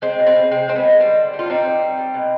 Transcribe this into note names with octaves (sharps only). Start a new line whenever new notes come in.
G#3 C4
B2
C4
G#3
C3 C4
G#3 C4
B3
D#3
G3 C4
D3
G3
F4
G3 C4 D#4
D3
G3
G3
B2